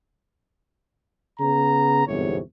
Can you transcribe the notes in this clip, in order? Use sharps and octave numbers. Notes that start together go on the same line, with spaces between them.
C#3 B3 A#5
G1 E2 G#2 C3 C#5